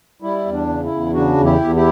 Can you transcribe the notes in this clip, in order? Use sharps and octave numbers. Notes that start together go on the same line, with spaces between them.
G3 E4
E2
D4
C#3
E4
E2
C#3 D4 F#4
E2
E4 G4
E2
E4 G4